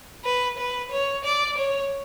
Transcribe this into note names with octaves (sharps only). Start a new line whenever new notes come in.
B4
B4
C#5
D5
C#5